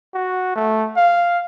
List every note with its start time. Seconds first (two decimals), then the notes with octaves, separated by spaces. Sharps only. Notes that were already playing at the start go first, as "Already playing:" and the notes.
0.14 F#4
0.56 A3
0.97 F5